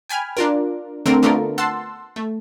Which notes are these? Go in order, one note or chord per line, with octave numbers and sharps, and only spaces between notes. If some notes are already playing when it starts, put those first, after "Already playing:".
G5 G#5 B5 F6
D4 F4 A#4
D3 A3 C4 A#4
D3 A3 B3 F4 A4 A#4
F#5 A5 C6 E6
A3